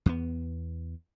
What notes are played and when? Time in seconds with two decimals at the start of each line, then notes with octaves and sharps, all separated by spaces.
0.06 E2 B3